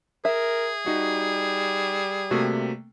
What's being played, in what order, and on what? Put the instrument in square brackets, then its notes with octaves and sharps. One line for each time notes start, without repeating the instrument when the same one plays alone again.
[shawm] G#4 [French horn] A#4 [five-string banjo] E5
[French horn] G3 [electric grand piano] D#4 F#4
[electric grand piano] C3 A3 A#3 [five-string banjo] F#4